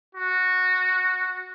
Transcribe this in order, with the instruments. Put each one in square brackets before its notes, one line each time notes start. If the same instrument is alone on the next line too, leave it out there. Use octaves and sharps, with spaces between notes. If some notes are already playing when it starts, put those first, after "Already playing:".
[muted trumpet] F#4